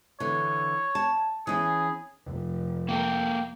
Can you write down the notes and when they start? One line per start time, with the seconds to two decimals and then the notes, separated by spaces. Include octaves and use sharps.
0.20 D3 E3 C#5
0.95 A5
1.47 E3 C#4 G#4
2.25 F1
2.89 A#3 A4 A#4 G5